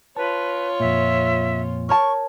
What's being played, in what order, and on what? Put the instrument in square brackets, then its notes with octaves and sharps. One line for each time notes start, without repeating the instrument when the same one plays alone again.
[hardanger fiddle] F4 C#5 [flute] B4 [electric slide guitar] A5
[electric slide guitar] F2 A#2 [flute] E5
[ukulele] A#4 C#5 A5 [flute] C#6